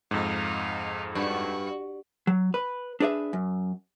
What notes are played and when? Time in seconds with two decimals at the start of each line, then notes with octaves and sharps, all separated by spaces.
0.11 F2 G#2 D#4 F5
1.15 G2 F#4
2.27 F#3
2.54 B4
3.00 D4 G#4 B4 D5 E5
3.33 F#2